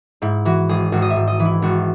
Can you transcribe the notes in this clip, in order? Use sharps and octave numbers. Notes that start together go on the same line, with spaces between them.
G#2 E4
E3 F#4
G#1 G#4
G#1 F#4
D#5
E5
G#2
D#5
E3
E4
G#1 F#4